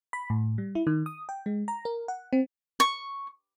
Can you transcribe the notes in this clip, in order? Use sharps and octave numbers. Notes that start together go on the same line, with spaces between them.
B5
A2
G3
E4
D#3
D#6
G5
G#3
A#5
A#4
F#5
C4
C#6